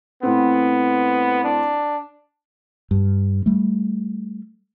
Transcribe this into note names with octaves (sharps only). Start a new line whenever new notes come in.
A2 B3 C4
D4
G2
G3 A3